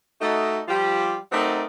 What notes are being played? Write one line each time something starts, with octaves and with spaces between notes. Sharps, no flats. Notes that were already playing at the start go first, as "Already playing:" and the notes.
A3 D#4 F#4
F3 G3 F4 G4
F#3 A3 C4 D#4 A#4 D5